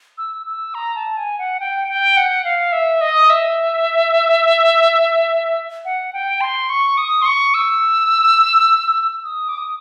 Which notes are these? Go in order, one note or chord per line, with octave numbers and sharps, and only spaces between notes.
E6
E6
A#5
A5
G#5
F#5
G5
G5
F#5
F5
E5
D#5
E5
F#5
G5
C6
C#6
D#6
C6
C#6
E6
D#6
D6
D#6